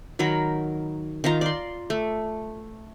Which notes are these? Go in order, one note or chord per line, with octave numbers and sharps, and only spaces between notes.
D#3 F#3 A#4 B5
D#3 D#4 F4 A#5
D5 C6
A3